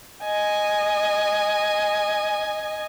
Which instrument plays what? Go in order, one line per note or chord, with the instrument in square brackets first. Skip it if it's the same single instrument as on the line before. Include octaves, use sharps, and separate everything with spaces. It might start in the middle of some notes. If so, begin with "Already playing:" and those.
[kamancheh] D#5 G#5